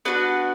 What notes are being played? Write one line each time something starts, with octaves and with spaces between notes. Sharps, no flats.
B3 D4 F#4 B4